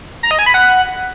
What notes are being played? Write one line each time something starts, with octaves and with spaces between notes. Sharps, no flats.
A#5
D#5
G#5
B5
F#5